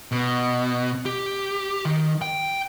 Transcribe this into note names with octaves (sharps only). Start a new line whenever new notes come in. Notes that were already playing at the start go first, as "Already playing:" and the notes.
B2
G4
D#3
G5